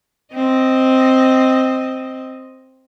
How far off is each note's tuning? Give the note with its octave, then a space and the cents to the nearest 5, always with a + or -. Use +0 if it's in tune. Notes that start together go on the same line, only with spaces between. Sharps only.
C4 +0 D#5 +0